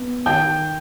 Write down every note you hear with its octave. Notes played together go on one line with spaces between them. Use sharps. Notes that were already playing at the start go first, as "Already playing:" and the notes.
Already playing: B3
D#3 G5 G6